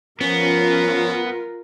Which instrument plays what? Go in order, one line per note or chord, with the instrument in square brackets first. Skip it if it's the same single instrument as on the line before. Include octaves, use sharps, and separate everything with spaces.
[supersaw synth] F3 C#4 [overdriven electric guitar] B3 [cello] F4 A#4